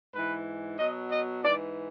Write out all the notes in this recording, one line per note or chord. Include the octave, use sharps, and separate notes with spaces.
G#2 E3 B4
B2 F#3 D#5
D#5
G#2 E3 D5